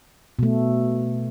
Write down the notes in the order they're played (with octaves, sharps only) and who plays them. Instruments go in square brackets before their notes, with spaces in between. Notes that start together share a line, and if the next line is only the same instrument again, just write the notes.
[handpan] B2 A3